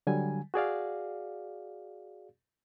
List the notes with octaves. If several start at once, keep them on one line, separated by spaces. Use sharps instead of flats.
D3 F#3 G3 G#5
F#4 G#4 D5 F5